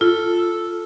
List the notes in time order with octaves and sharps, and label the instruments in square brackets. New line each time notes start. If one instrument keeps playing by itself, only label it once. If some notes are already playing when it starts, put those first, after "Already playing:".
[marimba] F4 [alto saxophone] A4